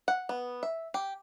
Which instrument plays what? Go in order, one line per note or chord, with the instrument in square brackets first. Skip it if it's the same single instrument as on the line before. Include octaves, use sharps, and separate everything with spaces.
[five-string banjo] F#5
B3
E5
G4